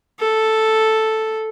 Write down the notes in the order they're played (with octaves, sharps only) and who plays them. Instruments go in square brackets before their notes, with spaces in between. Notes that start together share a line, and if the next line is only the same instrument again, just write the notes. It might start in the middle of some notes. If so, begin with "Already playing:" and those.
[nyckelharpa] A4